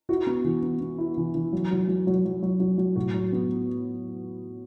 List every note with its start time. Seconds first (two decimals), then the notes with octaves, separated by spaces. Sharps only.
0.09 E4 F#4
0.27 B3
0.44 E3
0.62 B3
0.81 B3
0.98 E4
1.17 E3
1.35 E3
1.53 F#3
1.71 F#3
1.88 F#3
2.07 F#3
2.25 F#3
2.43 F#3
2.60 F#3
2.78 F#3
2.96 A2 F#4
3.14 F#3
3.32 B3